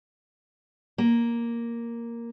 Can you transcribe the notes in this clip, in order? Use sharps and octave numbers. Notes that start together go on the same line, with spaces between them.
A#3